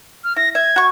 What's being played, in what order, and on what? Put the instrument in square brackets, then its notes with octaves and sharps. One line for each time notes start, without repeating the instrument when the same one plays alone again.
[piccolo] F6
[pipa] E4 [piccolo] A#6
[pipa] E5 [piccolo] G#6
[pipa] F#4 C#6